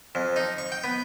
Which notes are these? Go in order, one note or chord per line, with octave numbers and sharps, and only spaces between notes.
F2
D#4
C#6
G5
B3